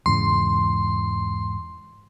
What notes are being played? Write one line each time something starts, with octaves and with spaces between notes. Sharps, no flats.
E2 G#2 C#3 C6